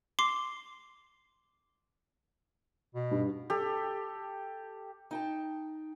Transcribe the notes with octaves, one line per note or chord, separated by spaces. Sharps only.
C6 D6 C7
B2
G2
G4 A4
D#4 G5 A5